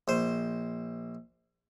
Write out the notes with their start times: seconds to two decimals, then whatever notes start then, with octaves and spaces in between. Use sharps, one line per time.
0.08 A#1 C5